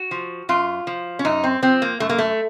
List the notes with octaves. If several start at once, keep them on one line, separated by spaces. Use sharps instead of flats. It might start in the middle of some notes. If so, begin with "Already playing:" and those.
Already playing: F#4
F3
F#2 F4
F3
C#4
F#2 D#4
C4
F3 C4
A#3
F#2 A3
A#3
A3